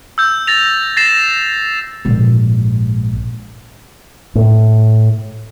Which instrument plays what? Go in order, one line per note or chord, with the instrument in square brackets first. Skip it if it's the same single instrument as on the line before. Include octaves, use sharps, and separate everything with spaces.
[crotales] E6 G6
A6 A#6 F7
A6 A#6 C7 E7
[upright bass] A#1 G#2
[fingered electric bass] A2